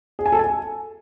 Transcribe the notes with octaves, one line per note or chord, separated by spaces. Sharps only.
G#4
G#5
A4
G#5